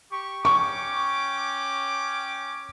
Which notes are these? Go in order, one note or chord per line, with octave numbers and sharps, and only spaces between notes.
G4 C#6
C#4 G5 C#6 D6